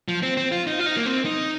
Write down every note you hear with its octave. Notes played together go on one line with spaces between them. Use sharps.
F3
C4
C4
F4
D#4
F4
D#4
A#3
C4
D#4